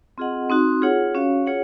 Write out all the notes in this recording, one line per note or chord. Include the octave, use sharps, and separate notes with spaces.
C4 F4 G#4 D#5 F#5
C4 D#4 F#4
F4 G#4 C#5 F#5
C#4 F#4 C#5 F5
F4 G#4 C#5 F#5